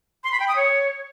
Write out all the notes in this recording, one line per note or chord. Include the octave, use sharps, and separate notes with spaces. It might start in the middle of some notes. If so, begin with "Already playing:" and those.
C6
B5
G5
D#6
C#5